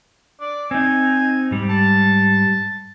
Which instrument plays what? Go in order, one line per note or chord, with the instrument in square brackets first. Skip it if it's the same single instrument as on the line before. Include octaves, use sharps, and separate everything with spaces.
[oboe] D5
[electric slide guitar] C4 D#4 [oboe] G#5
[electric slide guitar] G#2 G3
[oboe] A5